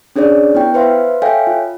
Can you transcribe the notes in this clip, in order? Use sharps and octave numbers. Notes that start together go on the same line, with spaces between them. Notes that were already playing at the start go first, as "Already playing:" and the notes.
C#4 D4 G#4 C#5 D5
B3 E4 G5
B4 C5 E5 F5 C6
A4 C#5 E5 F5 G5 G#5
F4